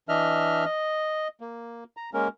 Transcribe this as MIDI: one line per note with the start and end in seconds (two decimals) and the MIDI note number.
0.09 0.65 52
0.09 0.65 62
0.09 0.65 75
0.09 0.65 76
0.09 0.65 89
0.65 1.28 75
1.41 1.84 58
1.97 2.10 82
2.14 2.28 56
2.14 2.28 58
2.14 2.28 61
2.14 2.28 70